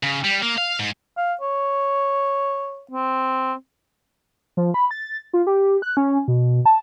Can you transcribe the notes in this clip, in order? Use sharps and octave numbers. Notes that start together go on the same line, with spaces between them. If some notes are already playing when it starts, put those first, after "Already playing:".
C#3
G3
A#3
F5
G#2
F5
C#5
C4
F3
B5
A6
F4
G4
F#6
C#4
B2
A5